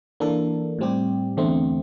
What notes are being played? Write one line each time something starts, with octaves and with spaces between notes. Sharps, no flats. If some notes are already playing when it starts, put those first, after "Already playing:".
E3 A#3 D4 A4
A2 G3 C4 G4
E2 D3 A3 C4